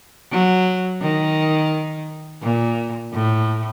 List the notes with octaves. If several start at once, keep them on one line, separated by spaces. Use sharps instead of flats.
F#3
D#3
A#2
A2